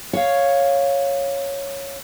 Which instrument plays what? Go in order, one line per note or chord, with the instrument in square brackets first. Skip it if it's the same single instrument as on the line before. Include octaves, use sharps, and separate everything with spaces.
[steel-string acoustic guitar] C#5 F5